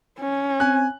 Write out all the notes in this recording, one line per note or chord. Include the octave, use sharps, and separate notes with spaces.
C#4
C4 G#5 F#6